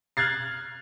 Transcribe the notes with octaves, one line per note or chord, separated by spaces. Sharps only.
F6 F#6 G#6 A6 C7